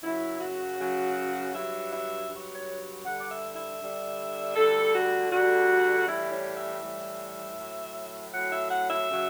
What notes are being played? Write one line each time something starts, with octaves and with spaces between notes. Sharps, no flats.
F#2 C#3 F#3 E4
F#4
F#2 C#3 F#3
G2 F#3 E5
E5
G2 F#3
C#5
G2 D3 G3 F#5
D5
E5
E5
G2 D3 G3
D2 D3 G3 A4
F#4
D2 D3 G3 F#4
A2 E3 G3 E4
C#5
E5
A2 E3 G3
A2 F#3
A2 F#3 F#5
E5
F#5
E5
C#3 F#3